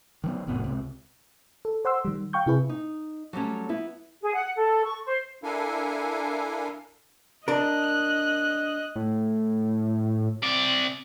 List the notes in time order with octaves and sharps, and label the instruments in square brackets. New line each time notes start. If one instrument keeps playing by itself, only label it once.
[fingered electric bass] D#3 F#3 B3
F1 A2 B3
C#2 C3
[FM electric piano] A4
C5 F#5 C6 E6
D#3 G3
F5 G5 C#6 G6
C3 E4 G#4 B4
[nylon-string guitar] D#4
F#3 G3 A3 C#4
B3 E4
[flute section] G#4
F#5
A4
C#6
C5
[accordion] D4 E4 A4 A#4 F5 G#5
[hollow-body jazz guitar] D4 A#4 [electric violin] D#5 F#6
[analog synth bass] A2
[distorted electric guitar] C3 D5